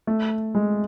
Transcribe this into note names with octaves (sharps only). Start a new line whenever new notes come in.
A3
G#3